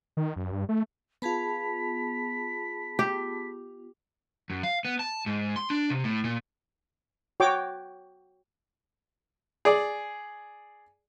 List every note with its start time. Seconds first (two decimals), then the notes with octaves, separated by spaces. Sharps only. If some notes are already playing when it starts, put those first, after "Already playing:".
0.17 D#3
0.36 F#2
0.52 G2
0.69 A3
1.22 B3 F4 G#4 A5 B5 B6
2.99 G4
4.50 F#2
4.63 F5
4.85 B3
4.99 A5
5.26 G#2
5.56 C6
5.70 D4
5.90 C3
6.04 A2
6.24 A#2
7.40 F#4 C#5 G5 D6
9.65 G#4 D5